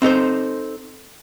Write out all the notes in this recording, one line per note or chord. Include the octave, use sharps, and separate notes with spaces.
C4 D#4 A4 C5